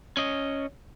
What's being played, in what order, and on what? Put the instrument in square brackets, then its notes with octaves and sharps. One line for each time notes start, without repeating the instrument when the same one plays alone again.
[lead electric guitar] C#4 D#5